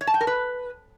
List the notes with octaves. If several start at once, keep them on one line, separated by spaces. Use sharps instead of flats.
C#5
A5
G5
A#4
B4